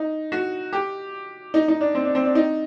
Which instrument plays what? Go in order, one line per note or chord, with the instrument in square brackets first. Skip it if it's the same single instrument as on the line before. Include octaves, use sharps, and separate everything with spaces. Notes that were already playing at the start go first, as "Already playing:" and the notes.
Already playing: [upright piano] D#4
F#4
G4
D#4
D#4
D4
C4
D4
C4
D4
D#4